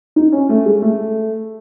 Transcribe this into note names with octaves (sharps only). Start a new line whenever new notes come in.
D#4
C#4
A3
G#3
A3